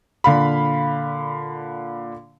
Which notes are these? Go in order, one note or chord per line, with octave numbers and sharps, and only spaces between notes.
A#2 D3 F5 B5